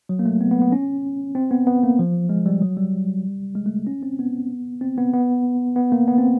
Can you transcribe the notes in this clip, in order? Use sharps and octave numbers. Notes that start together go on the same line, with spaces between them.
F#3
A#3
A3
B3
B3
B3
C#4
C4
B3
B3
A#3
F3
G#3
G3
F#3
G3
G#3
A3
C#4
C4
B3
C4
B3
B3
B3
A#3
B3
C4